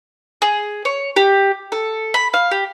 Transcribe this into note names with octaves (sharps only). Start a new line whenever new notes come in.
G#4
C#5
G4
A4
B5
F5
G4